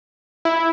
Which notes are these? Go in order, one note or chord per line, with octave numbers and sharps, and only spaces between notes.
E4